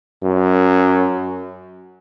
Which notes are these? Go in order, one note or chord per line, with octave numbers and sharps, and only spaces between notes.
F#2